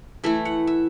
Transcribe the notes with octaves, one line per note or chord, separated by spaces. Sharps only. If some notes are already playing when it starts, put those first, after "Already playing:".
E3 A3 E4 E5
F#5
E5